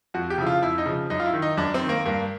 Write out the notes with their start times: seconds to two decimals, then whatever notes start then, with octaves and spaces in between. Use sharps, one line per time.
0.14 F2 F#4
0.30 G4
0.38 C#3 F3 E4
0.47 F4
0.62 F2 E4
0.78 D#4
0.85 C#3 F3
1.10 F#2 D#4
1.20 F4
1.26 E4
1.34 D#3
1.42 D#4
1.57 F#2 D4
1.74 C4
1.81 D#3
1.89 A#3
2.05 G2 A#3